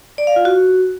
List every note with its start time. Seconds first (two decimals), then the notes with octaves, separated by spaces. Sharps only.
0.18 D5
0.27 F5
0.36 F4
0.45 F#4